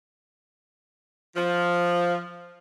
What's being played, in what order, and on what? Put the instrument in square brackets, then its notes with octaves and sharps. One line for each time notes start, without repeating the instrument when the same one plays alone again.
[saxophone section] F3